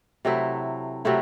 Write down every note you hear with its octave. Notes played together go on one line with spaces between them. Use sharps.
C3 F#3 A3 E4
C3 F#3 A3 E4